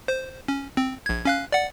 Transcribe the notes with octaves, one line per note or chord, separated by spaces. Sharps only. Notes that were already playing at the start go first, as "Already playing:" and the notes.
C5
C#4
C4
A#1 G#6
C#4 F5 F#6
D5 F#5